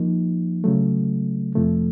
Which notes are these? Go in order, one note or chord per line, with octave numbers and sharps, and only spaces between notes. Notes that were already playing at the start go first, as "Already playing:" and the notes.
Already playing: F3 A#3 D#4
C#3 F#3 A3
F2 C3 F3 A3